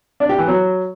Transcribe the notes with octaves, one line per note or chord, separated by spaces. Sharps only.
D4
G4
E3
F#3